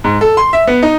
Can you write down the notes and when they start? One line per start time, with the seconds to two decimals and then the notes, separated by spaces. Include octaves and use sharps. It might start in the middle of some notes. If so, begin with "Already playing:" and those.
0.04 G#2
0.21 A4
0.37 C6
0.53 E5
0.67 B3
0.82 D#4